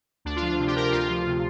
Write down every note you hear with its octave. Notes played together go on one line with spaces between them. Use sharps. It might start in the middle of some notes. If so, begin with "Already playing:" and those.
D2 D4
F4
F3
F4
C3
G4
D2 A#4
G4
D2 F4
F3
C3